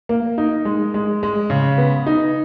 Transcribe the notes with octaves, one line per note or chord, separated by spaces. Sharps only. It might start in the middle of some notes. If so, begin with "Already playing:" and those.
A#3
D#4
G#3
G#3
G#3
C#3
B3
D#4